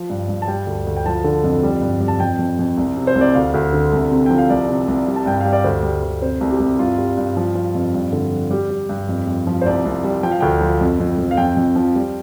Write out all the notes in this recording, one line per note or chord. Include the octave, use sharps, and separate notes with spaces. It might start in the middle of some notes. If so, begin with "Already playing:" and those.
Already playing: F3
G2
G2
A5
G3 G5
D2
D2
G5
F3 A5
D3
F2
G3
G2
G3
A5
F2 G5
F2
F2
C2
C3
C5
C2
D5
D2 F5
D2
D3
C2
C3
F3 G5
F5
C2 D5
C3
C2
G3
A5
G2 G5
F5
G3
D5
D2 C5
G3
D2
C3 C5
C2
G4
C2
G2 F4
G3
G2
F3
F3
F2
G2
D3
F3
G3 G4
G3
G2
F2
F2
F3
C5
C2 D5
C2
G3
F3 G5
F5
D2 G5
F3
F2
F2
F2
F5
F2 G5
F2
F3
G3